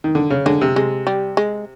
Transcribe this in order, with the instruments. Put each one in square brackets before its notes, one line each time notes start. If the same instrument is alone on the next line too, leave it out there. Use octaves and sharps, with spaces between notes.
[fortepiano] D#3
D3
C#3
[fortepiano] D3 [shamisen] G#3
[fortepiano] C3
[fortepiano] C3 [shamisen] G#3
[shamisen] G3
G#3